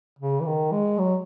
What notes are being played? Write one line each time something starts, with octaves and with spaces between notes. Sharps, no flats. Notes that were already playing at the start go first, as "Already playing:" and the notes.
C#3
E3
D#3
G#3
F#3